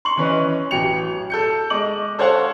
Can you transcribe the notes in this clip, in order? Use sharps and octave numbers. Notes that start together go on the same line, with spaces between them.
C6 C#6 F#7
E3 C#4 B4 D#5
A1 F#3 G5 C#7 F7
A4 G6 C#7
G#3 D#5 D6 F#7
A4 C5 C#5 F5 F#5 A5